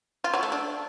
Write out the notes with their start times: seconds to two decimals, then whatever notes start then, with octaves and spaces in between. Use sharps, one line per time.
0.24 F4
0.34 F#3
0.43 A3
0.52 D4